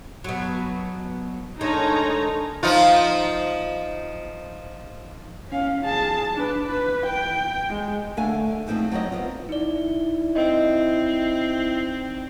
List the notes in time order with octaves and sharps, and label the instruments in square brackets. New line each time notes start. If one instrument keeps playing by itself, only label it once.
[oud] B2 F#3
[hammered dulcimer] D3 G#3 [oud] D#3 [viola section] D#4 C#5 A#5
[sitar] F3 D#4 F4
[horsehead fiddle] C#4 F5
G#4 A5
D4 B4
B4
G5
G#3
[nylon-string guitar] D3 A3 F5 G#5
F3 A3 C4 D#4 G#4
F#3 C4 C#4 D5 D#5
B3 C4 F4
[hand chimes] D#4 D5 [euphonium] E4
[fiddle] C4 [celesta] D#5